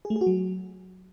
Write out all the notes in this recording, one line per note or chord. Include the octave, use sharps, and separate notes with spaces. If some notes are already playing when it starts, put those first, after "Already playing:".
G#4
A3
G#4
F#4
F#3